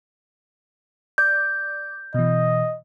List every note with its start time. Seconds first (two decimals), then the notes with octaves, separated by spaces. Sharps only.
1.18 D5 D6 G6
2.14 B2 E3 D#5